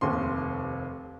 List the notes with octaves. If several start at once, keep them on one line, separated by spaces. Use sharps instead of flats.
F1 D#2 C3 C6